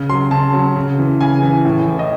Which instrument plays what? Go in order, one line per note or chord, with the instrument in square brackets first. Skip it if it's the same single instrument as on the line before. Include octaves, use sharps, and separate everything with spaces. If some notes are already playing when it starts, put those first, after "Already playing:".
Already playing: [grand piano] C#3
F#3 C6
C#3 A5
F#3
C#3
E3
C#3 G#5
E3
A2
E3
D#5